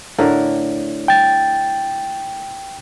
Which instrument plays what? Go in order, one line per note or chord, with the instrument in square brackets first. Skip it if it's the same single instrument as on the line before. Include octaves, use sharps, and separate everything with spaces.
[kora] A2 D3 A#4
[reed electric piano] G5 A6